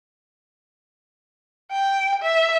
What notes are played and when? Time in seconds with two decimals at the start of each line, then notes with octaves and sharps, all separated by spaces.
1.72 G5
2.22 E5